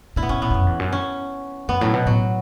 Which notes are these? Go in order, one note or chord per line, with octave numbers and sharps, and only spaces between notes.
B2 E4
B3
B2 C#4
A2 B3
E2
F#2
E2
F#2
C#4
F#2 B3
A2 F#3
B2
A2 F#3